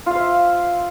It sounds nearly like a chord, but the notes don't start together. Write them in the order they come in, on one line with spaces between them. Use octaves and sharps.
F4 F5 C5 E5